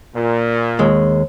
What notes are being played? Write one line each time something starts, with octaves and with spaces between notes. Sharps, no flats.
A#2
D#2 G#3